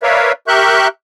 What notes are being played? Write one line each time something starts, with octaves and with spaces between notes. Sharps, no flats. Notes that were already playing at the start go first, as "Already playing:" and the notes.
A#4 B4 C#5 D5 E5 F5
G4 A#4 E5 C#6 F#6 G6